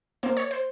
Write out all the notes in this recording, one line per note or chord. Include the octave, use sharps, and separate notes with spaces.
A#3 C5
C#5
C5